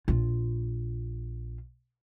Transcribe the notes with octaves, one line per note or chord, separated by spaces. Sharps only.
A#1 F4